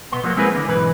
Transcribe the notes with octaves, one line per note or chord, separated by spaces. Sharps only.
B2 B3 C6
F3 F#3 A#3 F#4
G#3 C4 E4 G#4 A#4 B4
D#2 D3
B1 G#2 E3 B4 B5